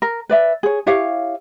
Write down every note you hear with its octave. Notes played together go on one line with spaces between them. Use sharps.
A#4
B4 D5 E5
G#4 C#5
E4 G4 C#5 F5